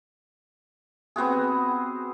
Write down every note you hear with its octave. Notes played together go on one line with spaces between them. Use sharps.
B3 C4 F#4 G#4